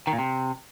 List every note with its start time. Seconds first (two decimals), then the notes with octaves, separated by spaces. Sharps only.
0.07 D#3
0.13 A#2
0.19 C3